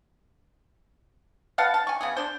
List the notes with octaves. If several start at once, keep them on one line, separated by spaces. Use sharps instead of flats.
B4 F5 F#5 A5
A5
G#5 C#6
C#3 B3 G#4
D4 C5